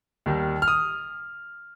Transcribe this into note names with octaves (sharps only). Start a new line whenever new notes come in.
D#2 D#3 G3
F6
D#6